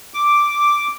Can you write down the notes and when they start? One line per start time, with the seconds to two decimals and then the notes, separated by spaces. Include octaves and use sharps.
0.14 D6